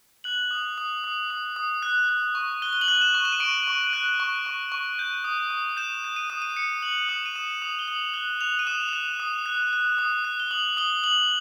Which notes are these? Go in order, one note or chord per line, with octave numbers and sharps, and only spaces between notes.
F#6 F#7
D#6
D#6
D#6
D#6
D#6
F#6
F#6
C#6
F#6 G7
G7
F#7
F#6
E7
C#6
E7
D#7
C#6 D7
C#6
F#6
C#6
C#6
C#6
G6
D#6
D#6
G6 E7
G6
D#7
D#6 E7
D#7
D#6 C#7
F#6 F#7
D#6 E7
D#7
D#6 E7
D#6 F7
G7
D#6 F#7
F#6 G7
F#6 F7
D#7
D#6 E7
E7
F#6 F7
D#6
F#6
F#6
D#6
F#6
G7
D#6 F#7
D#6 G7
D#6 F#7